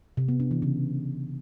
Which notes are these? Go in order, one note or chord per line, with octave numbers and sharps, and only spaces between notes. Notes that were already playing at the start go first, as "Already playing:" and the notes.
C3
B3
D4
E3
C#3